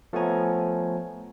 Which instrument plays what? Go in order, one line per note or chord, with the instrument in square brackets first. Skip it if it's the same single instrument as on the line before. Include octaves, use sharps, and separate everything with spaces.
[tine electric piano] F3 A3 B3 C#5 G#5 A#5